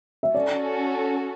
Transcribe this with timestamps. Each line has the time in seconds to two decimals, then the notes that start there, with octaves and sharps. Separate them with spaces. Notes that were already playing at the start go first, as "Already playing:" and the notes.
0.23 E5
0.35 C#4 F#4 A4 D5